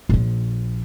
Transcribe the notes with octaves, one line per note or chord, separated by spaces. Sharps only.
A#1 F3